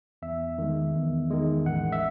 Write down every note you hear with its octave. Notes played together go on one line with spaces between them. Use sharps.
E2 E5
D#3 G#3
E2
D#3 G#3
A1 F#5
E5